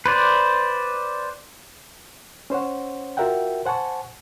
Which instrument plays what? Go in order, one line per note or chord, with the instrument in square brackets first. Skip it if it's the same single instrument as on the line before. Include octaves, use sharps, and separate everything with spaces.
[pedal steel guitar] B4 C5 D5
[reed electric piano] C#4 C5 C#5 F#5
F4 F#4 A#4 E5 F#5 G5
C5 F#5 G#5 A5 C#6